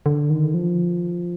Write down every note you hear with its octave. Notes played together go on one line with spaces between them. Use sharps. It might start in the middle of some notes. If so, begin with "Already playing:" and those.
D3
D#3
F3